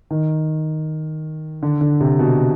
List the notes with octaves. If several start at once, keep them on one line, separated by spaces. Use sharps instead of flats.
D#3
D3
D3
C3
B2